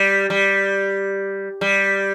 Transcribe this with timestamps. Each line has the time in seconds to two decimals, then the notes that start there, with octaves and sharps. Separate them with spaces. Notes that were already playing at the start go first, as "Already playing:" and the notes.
Already playing: G3
0.30 G3
1.61 G3